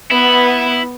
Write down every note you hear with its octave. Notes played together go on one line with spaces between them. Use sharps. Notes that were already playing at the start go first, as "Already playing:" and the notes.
B3 E4